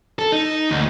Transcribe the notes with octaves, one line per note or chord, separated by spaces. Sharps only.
A4
D#4
D2